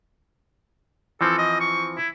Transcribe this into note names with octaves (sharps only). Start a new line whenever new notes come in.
E3 F3 C4 A4
D#5
C#6
E4